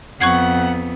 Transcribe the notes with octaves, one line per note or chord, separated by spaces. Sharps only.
F2 B3 F#5 C#6 G#6 C7